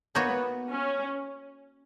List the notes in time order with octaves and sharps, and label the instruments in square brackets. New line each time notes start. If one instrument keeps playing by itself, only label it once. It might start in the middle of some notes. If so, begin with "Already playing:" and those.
[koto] A#3 D#4 F#4 C#5 [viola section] B3
[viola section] C#4